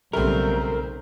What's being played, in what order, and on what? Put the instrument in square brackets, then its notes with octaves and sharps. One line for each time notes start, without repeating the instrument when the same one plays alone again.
[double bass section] B1 [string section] C#3 C4 [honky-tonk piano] G3 A3 [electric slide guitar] A#4